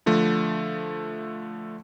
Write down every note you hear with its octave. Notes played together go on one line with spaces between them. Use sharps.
D3 F3 A3